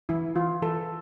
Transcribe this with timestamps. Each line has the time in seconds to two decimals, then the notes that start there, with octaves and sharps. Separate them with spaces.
0.09 E3 E4
0.35 E3 F4
0.62 E3 A4